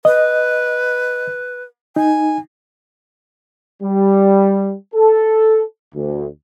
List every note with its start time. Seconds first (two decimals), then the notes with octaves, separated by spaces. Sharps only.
0.05 B4 D#5
1.96 D#4 G#5
3.83 G3
4.95 A4
5.94 D2